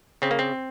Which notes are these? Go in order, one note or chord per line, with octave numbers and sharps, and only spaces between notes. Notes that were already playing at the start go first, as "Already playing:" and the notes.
C#3 C4
A#3
C4